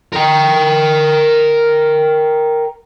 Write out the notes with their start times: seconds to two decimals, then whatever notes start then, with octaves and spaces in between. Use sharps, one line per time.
0.13 A#4 G5